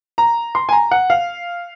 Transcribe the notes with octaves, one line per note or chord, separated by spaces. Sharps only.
A#5
C6
G#5
A#5
F#5
F5